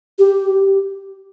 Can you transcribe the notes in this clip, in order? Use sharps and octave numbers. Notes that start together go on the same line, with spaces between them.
G4